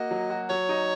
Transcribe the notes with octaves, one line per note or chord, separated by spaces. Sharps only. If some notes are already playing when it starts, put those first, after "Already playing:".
Already playing: A#3 F#4 D#5
F#3
F#4
F#3 C#5
D#4